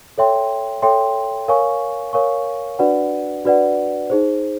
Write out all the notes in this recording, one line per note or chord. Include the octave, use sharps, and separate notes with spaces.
A4 C#5 E5 G5 C6
A4 C#5 E5 G5 C6
A#4 C#5 F5 G#5 C#6
A#4 C#5 F5 G#5 C#6
D4 F#4 B4 D5 F#5
D4 F#4 B4 D5 F#5
D#4 G#4 C5